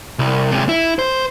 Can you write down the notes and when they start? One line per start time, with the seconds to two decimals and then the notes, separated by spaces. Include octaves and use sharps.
0.19 C2
0.51 C3 G#3
0.69 E4
0.99 C5